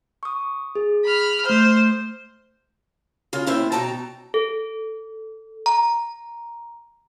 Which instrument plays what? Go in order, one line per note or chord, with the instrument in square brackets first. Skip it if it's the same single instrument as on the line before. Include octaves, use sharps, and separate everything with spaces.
[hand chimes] C#6 D#6
G#4
[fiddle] B5 F6
[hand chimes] A3 F6 [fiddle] C5
[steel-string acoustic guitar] C#3 F4
D#2 C#4 E4 C5 G5
B2 D#4 G5 A5 A#5
[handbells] A4
A#5